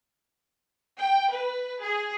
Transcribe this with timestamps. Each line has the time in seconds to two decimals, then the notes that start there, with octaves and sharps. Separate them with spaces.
1.01 G5
1.31 B4
1.81 G#4